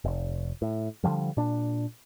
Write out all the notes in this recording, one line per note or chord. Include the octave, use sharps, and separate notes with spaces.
F1
A2
D3 D#3 F3 G3
A#2 D4